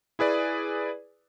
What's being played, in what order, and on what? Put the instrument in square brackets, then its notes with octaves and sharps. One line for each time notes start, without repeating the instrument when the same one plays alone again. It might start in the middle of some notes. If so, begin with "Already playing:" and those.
[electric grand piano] E4 G#4 B4 D5